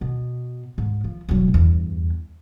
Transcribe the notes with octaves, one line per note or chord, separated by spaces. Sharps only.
B2
G#2
F3
E1 F#3
E2 G2